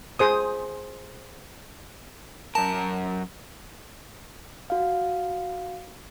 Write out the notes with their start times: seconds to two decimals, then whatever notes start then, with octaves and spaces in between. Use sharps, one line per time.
0.19 G#4 C5 D#6
2.55 F#2 A#4 A5
4.70 F#4 F5